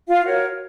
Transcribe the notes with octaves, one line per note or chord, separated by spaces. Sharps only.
F4 F5
F#4 A#4 C#5